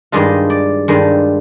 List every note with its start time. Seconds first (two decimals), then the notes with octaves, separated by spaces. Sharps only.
0.12 G2 D#3 G#3 D4 F4 D#5
0.50 D5
0.88 G2 D#3 G#3 D4 F4